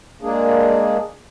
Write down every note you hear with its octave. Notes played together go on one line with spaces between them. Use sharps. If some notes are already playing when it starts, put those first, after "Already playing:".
G#3 A#3 D4 G#4